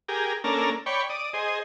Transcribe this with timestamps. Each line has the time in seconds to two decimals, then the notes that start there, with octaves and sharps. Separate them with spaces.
0.08 G4 G#4 A#4
0.44 A#3 C#4 D4 A4 A#4
0.86 C#5 D5 G5 B5 C#6
1.10 D5 D#6
1.34 G#4 C5 D#5